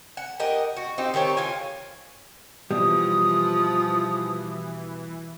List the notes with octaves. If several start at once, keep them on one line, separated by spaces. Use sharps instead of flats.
F#5
G4 A#4 D#5 F#5
F#4
C4 D#4 F4 G4
D#3 C4 G4 C#5
E3 F4 G#5
B2 E3 F3 G3 D#6